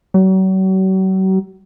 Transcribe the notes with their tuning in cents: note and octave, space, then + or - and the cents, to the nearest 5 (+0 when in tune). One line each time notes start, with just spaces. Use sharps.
F#3 +40